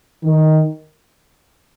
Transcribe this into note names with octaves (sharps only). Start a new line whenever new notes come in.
D#3